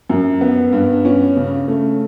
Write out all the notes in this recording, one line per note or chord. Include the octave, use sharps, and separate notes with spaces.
F#2
B3
G2
C#4
C#3
A3